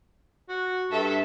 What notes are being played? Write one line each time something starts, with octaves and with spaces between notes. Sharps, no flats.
F#4
G2 A4 E5